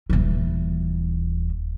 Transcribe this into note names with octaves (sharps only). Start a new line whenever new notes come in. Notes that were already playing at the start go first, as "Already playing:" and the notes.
D#1 E3